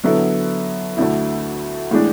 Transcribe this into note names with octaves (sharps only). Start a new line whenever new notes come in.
D3 F#3 B3 E4 A4
D2 D3 A3 E4
A2 E3 G#3 D4